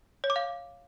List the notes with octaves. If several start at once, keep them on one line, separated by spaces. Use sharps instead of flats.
C#5
D6
F5